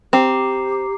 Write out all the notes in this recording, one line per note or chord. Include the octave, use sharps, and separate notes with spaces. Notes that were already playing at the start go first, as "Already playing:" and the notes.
C4 G4 A#5 D6 C7